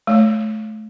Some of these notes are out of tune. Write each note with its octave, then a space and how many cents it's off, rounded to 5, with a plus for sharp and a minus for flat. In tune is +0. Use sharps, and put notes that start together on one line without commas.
A3 -30 C#5 +0